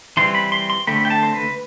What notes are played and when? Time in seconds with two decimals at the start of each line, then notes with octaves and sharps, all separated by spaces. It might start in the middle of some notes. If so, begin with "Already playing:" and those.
0.17 E3 G3 C4 C6
0.35 B5
0.52 C6
0.70 C6
0.87 D3 A3 C4 B5
1.05 G5
1.10 A5
1.23 C5
1.34 B4